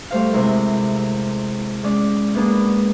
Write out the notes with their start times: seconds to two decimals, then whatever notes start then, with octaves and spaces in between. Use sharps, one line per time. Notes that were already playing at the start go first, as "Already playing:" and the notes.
0.11 G3 A3 C5 F5
0.33 C3 G#3 C4 E4 A#4
1.83 G#3 C#4 D5
2.35 G#3 A#3 B3 D4